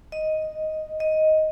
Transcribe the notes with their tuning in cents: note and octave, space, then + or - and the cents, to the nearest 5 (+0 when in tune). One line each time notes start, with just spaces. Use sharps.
D#5 +0
D#5 +5